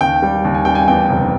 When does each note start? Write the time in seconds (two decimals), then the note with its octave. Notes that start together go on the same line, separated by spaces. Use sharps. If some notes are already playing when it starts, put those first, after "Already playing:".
0.01 D#2 G5
0.22 G3
0.44 D#2
0.54 G#5
0.65 G3 G5
0.75 G#5
0.88 E2 G5
1.10 F1